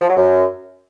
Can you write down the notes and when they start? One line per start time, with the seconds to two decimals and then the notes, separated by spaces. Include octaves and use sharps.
0.02 F3
0.09 F#3
0.17 F#2